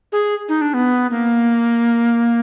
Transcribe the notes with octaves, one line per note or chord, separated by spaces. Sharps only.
G#4
D#4
D4
B3
A#3